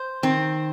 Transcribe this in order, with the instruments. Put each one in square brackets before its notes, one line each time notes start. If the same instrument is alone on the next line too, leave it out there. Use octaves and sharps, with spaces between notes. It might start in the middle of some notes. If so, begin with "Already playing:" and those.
Already playing: [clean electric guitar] C5
[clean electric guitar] D#3 [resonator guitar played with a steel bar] C4